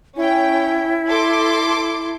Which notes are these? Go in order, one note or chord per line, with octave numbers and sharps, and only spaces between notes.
C#4 E4 G5
A4 C6 D6